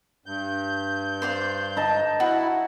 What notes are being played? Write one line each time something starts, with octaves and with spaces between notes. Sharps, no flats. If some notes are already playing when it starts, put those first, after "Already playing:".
G2 G6
C5 D5 F5
D#4 A5
E4 F#4